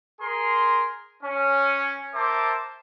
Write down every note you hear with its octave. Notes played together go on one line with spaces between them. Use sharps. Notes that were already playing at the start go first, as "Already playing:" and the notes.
G#4 A#4 C6
C#4
A#4 C5 E5 A5 D6